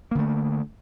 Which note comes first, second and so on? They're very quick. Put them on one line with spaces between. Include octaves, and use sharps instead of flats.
A#3 D3 A3